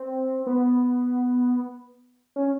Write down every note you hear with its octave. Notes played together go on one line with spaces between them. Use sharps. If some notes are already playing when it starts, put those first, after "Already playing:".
Already playing: C4
B3
C#4